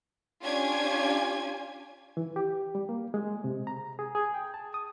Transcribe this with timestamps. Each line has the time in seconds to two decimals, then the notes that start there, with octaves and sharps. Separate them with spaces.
0.42 C#4 D4 F4 G4 G#5 G#6
2.17 E3
2.36 G4
2.75 G3
2.89 A#3
3.14 G#3
3.44 C3
3.67 A#5
3.99 G#4
4.15 G#4
4.34 G5
4.54 A5
4.74 D#6